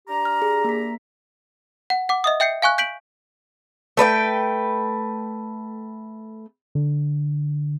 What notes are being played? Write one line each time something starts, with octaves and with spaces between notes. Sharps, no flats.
D4 G4 A#5
F6
G#4
A#3 B6
F#5
F#5 D6
D#5 E5 D#6
E5 G5 G6 C7 C#7
F5 G#5 C#6 F#6
G6 B6 D7 F#7
A3 B4 D5 G5
D3